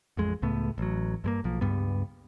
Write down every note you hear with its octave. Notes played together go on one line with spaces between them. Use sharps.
A1 F2 G#3
C#2 A2 A3 B3
A1 F#3
G2 G#3 A#3
B1 F3 A#3
C#2 G2 G3 B3